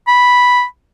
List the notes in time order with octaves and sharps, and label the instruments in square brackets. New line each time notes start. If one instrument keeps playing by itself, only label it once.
[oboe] B5